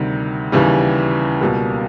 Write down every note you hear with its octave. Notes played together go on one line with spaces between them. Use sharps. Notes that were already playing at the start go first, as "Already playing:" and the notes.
Already playing: D2 C3 D#3 G3
D#2 C#3 E3 G3
C#2 B2 G3 A#3